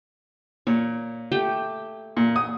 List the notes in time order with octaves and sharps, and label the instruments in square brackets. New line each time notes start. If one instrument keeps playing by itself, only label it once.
[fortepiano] A#2 [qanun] C#5
[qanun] A3 G4 G5
[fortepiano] A#2
D#6